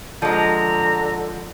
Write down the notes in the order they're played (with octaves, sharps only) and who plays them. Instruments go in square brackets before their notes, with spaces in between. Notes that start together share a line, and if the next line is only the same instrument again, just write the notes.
[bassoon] D3 [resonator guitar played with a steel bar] F3 G#3 [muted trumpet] A#5